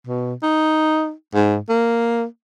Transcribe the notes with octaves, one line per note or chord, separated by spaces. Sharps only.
B2
D#4
G#2
A#3